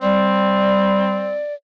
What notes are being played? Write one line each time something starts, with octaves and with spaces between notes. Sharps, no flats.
G3 C4 D5